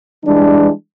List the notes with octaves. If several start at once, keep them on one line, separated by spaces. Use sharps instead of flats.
E3 G3 G#3 D4